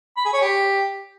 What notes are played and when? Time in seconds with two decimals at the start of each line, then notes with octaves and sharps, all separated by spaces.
0.17 B5
0.25 G#4
0.33 C#5
0.41 G4